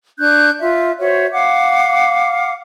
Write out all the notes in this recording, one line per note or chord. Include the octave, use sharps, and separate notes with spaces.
D4 C#6 F#6 G6
F4 E5
F#4 C5 C#5 E5
F5 F#5 D6